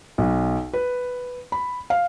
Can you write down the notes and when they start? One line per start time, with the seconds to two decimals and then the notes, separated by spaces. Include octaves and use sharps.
0.18 B1
0.73 B4
1.52 B5
1.90 F5